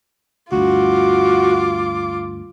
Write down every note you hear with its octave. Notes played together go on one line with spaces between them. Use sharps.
D2 G2 F4 F#4 D6